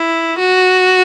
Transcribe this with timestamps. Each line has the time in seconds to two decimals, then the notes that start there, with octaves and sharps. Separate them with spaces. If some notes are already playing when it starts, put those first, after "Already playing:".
Already playing: E4
0.38 F#4